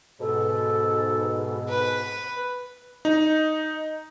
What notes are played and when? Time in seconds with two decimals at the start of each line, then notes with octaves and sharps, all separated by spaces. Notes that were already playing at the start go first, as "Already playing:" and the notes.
0.20 G#2 B2 A4
1.68 B4
3.05 D#4